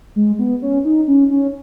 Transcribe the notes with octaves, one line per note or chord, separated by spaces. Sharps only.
G#3
B3
C#4
D#4
C#4
C#4